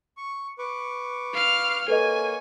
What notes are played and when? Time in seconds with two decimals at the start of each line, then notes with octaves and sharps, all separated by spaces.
0.17 C#6
0.59 B4 C#6 D6
1.33 F5 F6
1.88 A#3 A4 B4 C#5 D#5 G#5